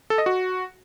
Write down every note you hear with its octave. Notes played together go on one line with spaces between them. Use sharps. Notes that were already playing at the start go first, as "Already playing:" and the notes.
A4
D#5
F#4